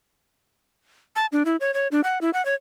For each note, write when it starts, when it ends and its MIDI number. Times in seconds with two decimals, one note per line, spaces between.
1.16 1.26 81
1.32 1.43 62
1.45 1.56 64
1.60 1.74 73
1.74 1.88 73
1.92 2.01 62
2.04 2.19 78
2.21 2.30 64
2.33 2.44 78
2.46 2.54 73